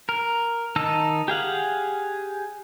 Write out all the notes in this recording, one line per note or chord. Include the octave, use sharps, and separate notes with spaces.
A#4
D#3 D#4 A5 E6
G4 G#4 F5 F#5